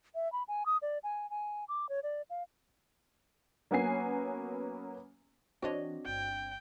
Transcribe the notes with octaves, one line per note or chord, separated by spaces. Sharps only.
E5
B5
G#5
D#6
D5
G#5
G#5
D6
C#5
D5
F5
F#3 A#3 B3 C#4 G#5 C7
E3 C4 D4 F#4 C#5 D#5
G1 G5